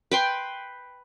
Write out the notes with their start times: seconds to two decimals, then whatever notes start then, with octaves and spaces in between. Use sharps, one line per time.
0.11 B4 G5 C6